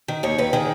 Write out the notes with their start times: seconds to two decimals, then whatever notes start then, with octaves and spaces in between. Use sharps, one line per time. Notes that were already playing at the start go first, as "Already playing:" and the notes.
0.08 D#3
0.23 D#2 C#5
0.38 D#2 B4
0.53 D#3 G#4